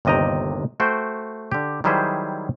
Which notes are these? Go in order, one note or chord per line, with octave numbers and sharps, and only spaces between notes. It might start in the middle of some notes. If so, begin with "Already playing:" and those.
G1 D#2 C3 D#5 G5 A#5
A3 F#4 C5 G5
D3 G4
D#3 F#3 G3 E4 G#4 C5